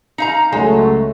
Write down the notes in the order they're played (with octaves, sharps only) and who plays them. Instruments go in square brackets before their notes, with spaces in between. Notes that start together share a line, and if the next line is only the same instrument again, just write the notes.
[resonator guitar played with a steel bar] D#4 F5 A#5
[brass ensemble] C#2 F#3 A3 [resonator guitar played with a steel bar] G#3